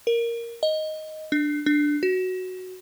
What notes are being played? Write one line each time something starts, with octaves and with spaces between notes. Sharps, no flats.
A#4
D#5
D4
D4
F#4